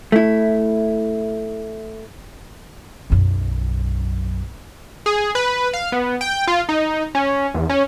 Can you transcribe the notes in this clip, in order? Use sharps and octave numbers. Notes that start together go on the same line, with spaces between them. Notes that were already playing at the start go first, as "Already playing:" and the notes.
A3 E4
B1 F#2
G#4
B4
F5
B3
G5
F4
D#4
C#4
E2
C#4